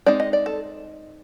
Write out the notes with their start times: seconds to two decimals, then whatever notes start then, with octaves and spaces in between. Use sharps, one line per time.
0.06 G#3 C4 D#4 D5
0.20 D#5
0.33 D5
0.46 A4